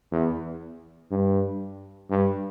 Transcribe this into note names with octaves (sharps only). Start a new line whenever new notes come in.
E2
G2
G2